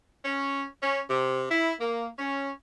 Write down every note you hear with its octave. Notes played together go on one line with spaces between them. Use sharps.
C#4
C#4
C3
E4
A#3
C#4